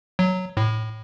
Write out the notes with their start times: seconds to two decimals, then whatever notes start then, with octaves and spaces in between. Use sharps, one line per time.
0.19 F#3
0.57 A2